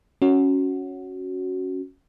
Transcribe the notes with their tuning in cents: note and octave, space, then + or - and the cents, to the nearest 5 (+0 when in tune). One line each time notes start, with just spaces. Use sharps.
C#4 +0 F#4 +0